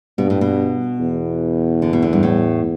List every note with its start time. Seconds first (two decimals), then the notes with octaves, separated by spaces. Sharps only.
0.18 G2 B2
0.30 A2
0.41 B2
1.00 E2
1.82 D3
1.93 B2
2.02 D3
2.13 G2
2.23 A2